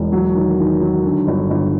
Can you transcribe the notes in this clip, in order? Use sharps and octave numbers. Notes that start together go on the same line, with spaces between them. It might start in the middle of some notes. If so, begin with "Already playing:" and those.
Already playing: E1
F#3
D#3
D#3
F#3
D3
G1
G1